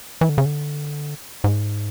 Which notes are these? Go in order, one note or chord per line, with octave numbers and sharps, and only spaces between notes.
E3
D3
C#3
D3
G#2